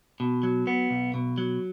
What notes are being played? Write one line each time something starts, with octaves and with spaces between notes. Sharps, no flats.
B2
F#3
B3
B1
B2
F#3